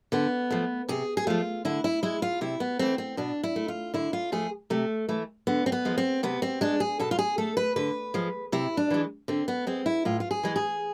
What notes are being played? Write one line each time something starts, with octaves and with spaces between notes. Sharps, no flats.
D3 B3
F3 A3
C3 G#4
G#4
F3 A3 F4
D3 E4
E4
G#3 E4
F4
C3 E4
B3
E3 A3 C4
C4
B2 D4
E4
A3
F4
D3 E4
F4
F3 A3 G#4
C3 A3
E3 A3
D3 B3
C4
B3
F3 G#3
C4
C3 B3
C4
G#3 D4
G#4
B2 A4
F4
G#4
A3 A4
B4
D3 B4
F3 G#3
C3 E4
D4
E3 G#3
D3 C4
B3
G#3 C4
E4
A2 F4
F4
G#4
E3 G#3
G#4